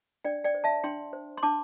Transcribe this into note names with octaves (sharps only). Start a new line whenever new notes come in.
D4 D5 G5
D5 G5
C5
E5 A5
D4 G5 C6
C5
C6
D4 A5 D6